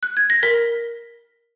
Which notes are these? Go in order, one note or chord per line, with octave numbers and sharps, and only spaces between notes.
F#6
G#6
A#6
A#4 B6